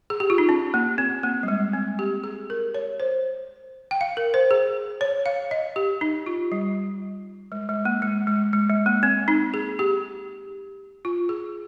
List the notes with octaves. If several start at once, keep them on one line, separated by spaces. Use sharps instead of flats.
G#4
G4
F4
D#4
C#4
A#3
C4
A#3
G3
G#3
C4
G4
G#4
A#4
C#5
C5
G5
F5
A#4
C5
G#4
C#5
F5
D#5
G4
D#4
F4
G3
G#3
G#3
A#3
G#3
G#3
G#3
G#3
A#3
C4
D#4
G#4
G4
F4
G#4